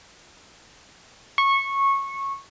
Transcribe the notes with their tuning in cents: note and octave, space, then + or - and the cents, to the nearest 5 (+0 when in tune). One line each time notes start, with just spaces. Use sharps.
C#6 -15